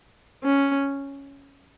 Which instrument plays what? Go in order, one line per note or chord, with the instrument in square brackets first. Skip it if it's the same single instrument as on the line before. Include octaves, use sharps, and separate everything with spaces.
[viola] C#4